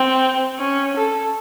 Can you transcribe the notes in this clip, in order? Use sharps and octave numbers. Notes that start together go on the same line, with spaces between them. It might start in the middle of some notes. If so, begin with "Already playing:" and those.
Already playing: C4
C#4
A4